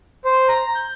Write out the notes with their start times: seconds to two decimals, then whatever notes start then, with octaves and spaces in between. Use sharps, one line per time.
0.25 C5
0.48 A#5
0.75 G6